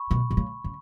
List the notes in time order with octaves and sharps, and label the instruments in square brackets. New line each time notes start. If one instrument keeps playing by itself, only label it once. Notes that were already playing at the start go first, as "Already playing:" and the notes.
Already playing: [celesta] B5 C#6
[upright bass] B2
C3
C#3
C#3